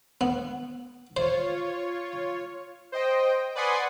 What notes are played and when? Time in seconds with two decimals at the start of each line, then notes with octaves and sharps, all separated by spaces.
0.21 B3
1.17 F4 C5 C#5
2.92 C5 D#5 G5
3.55 B4 D5 F#5 G#5 C6 D#6